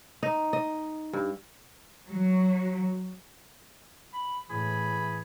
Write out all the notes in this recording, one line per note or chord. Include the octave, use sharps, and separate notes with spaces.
D#4
D#5
G2
F#3
B5
A2 E3 G#4 B5